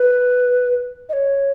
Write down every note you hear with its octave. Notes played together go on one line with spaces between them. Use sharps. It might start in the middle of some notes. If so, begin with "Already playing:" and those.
Already playing: B4
D#5
C#5